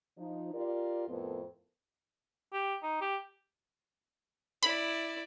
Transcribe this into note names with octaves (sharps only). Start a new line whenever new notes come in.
F3 D#4
F4 G4 A#4 D5
F2 A2 B3 A4 A#4 C5
G4
D#4
G4
E4 D5 B5